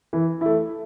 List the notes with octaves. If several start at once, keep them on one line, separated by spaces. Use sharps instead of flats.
E3
A3 E4